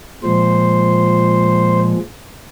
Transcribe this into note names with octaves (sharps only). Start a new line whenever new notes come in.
A#2 F3 G#3 C5